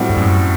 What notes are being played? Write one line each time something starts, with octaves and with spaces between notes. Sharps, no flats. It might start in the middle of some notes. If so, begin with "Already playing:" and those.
Already playing: A2 G3 C4 F#4
G2
F#2